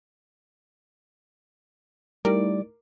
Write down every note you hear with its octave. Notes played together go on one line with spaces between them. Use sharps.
G3 A3 D#4 E4 A#4 D5